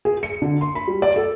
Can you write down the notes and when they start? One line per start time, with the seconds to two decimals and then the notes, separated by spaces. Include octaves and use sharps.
0.05 G#4
0.23 C#7
0.42 D3
0.61 C6
0.75 B5
0.88 G3
1.02 D5
1.16 A4